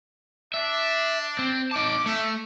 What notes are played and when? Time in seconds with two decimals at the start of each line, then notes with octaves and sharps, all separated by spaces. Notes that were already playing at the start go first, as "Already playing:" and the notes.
0.54 D4 E5
1.39 C4
1.71 C#4 D#4 A5 D6
2.06 A3 C#4 E5